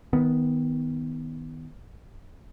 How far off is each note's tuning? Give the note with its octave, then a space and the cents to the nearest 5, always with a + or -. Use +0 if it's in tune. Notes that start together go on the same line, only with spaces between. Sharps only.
D#3 +20 B3 +0